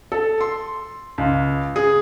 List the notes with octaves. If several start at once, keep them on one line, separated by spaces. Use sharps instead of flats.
A4
C6
C#2
G#4